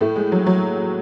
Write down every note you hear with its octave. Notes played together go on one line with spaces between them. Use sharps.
A2 A3
G#3
F#3
F#3